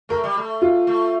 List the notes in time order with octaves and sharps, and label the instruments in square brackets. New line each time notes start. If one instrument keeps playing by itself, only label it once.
[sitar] A3 [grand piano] A#4
[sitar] G3
A3
[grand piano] F4
[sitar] A3